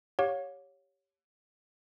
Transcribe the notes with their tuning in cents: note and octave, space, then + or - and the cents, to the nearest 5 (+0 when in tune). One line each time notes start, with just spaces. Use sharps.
G4 +0 C#5 +0 F5 +45